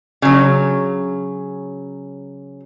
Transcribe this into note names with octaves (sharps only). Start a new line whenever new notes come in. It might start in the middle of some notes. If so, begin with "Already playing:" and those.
C#3 F#3